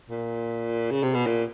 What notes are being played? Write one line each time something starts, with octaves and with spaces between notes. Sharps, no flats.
A#2
C#3
C3
B2
A#2